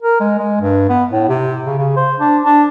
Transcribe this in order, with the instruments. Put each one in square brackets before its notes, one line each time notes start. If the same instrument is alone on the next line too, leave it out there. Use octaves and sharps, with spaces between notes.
[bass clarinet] A#4
G#3
G#3
G2
B3
A2
C3
C#3
C#3
C5
D4
D4